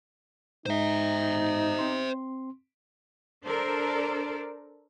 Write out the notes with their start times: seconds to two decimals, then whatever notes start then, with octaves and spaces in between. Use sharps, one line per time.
0.66 G#2 G#3 D#4 C5 E5
1.79 C4 C6
3.45 D4 A4 A#4 C5 D5